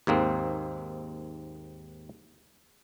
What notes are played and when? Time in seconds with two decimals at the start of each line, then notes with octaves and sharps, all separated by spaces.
0.07 D#2 G#2 A#3 C4